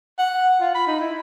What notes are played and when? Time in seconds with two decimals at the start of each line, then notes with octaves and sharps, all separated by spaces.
0.19 F#5
0.61 F4
0.75 B5
0.87 D#4
1.00 E4